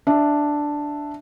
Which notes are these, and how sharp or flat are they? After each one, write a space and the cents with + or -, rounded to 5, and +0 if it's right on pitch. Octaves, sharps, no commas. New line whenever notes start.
D4 +0 E5 +0